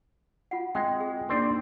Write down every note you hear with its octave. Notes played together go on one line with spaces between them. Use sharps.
F4 F#5
G#3 C4 G5
G#4
A#3 C4 D4 D#4 C5 D5